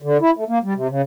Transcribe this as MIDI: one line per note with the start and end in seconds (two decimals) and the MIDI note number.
0.02 0.17 50
0.21 0.31 64
0.37 0.44 57
0.48 0.59 58
0.64 0.73 55
0.75 0.88 48
0.90 1.02 49